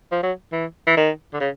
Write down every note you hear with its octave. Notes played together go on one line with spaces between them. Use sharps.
F3
F#3
E3
E3
D#3
D3
C#3